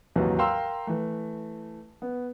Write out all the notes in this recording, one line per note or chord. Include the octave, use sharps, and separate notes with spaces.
D#2 G#2 C3 E3 F#3
A#4 F5 G5 A#5 C6 E6
E3 A3
B3